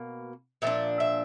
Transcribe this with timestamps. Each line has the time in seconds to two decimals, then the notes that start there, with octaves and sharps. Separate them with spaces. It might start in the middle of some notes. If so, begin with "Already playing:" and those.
Already playing: B2 A#3
0.62 A#2 F3 D4 E5
1.00 E5